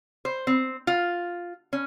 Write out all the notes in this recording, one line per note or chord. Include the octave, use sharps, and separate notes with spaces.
C5
C4
F4
C#4